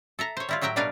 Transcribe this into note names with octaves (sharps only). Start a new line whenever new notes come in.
A4 E5 A#5
C5 C#5
G3 E4 F4
A2 F#3 E5 G5 A#5
B2 G3 D4 A#4 B4 F5